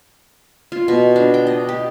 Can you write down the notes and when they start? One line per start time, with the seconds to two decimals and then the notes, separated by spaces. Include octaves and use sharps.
0.72 F4
0.88 B2
1.16 D4
1.34 G5
1.47 D#5
1.69 G4